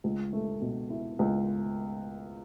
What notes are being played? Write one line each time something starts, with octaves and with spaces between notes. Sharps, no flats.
C#2
A3
B2
E4
C#2